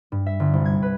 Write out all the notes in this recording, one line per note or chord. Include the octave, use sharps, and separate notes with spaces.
G2
E5
G1
C2
G#6
B4